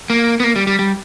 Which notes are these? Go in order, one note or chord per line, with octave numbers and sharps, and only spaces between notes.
A#3
B3
A#3
G3
G3
G3